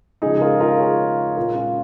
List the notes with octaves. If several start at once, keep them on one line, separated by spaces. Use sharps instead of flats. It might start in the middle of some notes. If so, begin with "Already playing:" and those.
C#3 F3 G#3 D#4 G#4
G#4
F4 A#4
F4 A#4
G#4 C#5
A#2 G#3 F4 A#4
C#4 F4